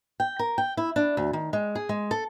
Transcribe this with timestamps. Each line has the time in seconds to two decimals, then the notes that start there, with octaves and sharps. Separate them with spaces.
0.20 G5
0.39 A#4
0.58 G5
0.77 E4
0.96 D4
1.17 D2
1.33 D#3
1.53 G#3
1.75 G#4
1.89 G#3
2.11 A4